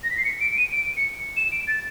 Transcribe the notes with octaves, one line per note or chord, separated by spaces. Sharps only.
A#6
B6
C7
C#7
D7
D#7
D7
C#7
E7
D7
A6